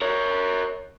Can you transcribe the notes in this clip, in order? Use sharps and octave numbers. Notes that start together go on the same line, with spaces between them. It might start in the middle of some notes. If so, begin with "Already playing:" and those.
A#4 C#5